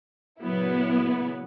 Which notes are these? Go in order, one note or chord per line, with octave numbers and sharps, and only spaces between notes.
A#2 C#3 F#3 B3 E4